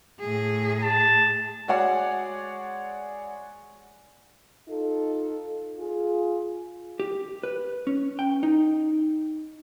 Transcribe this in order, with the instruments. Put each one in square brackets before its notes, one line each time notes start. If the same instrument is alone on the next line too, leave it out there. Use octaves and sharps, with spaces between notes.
[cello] A2 G#4
[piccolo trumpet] A5
[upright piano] G#3 F#4 G#4 C#5 D5 F#5
[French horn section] D#4 F4 A4
F4 G#4
[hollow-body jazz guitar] G4
B4
C#4
G5
D#4